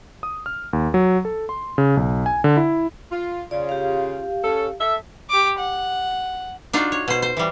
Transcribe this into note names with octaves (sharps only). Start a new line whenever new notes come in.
D#6
F6
D#2
F#3
A4
C6
C#3
B1
G#5
D3
E4
F4
C#3 F4 D5
G4 F5
C#4 A4
A4 E5
G4 D6
F#5
D4 D#4 F4 F#4
C#5
B2 C5
C5
E3 G3